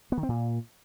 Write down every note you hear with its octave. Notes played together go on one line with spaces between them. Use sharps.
B3
D#3
C4
A#2